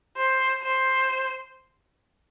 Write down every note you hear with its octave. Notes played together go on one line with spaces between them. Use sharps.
C5
C5